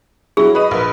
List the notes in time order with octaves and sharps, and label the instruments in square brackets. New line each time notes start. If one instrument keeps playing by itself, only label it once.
[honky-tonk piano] F#3 E4 [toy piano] G#4
[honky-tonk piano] B4 D#7 [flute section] D#5 D#6
[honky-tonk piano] A#1 [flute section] A#4 B4